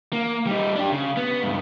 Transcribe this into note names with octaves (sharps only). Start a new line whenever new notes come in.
A#3
G3 D#4
D4 G4
C#3
B3
C#2 G2